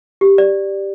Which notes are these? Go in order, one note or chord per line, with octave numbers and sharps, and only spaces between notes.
G4
D5